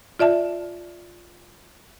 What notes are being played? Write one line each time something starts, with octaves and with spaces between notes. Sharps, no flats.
F4 D5 E5 A5